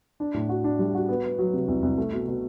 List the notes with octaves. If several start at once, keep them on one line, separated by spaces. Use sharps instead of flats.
D4
A2
F#4
D4
G3
F#4
B3
B3
F#3
C3
C2
C2
A3
B2
B2